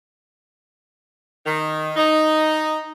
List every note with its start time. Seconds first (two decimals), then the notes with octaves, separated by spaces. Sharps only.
1.47 D#3
1.96 D#4